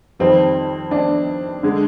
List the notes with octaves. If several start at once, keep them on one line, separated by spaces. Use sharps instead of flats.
F2 D#3 G3 C4
D4
D3 G#3